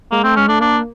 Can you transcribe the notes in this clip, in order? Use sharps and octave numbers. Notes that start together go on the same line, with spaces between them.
G#3 A#3
A3 C4
G#3 C#4
A3 D4
A#3 D4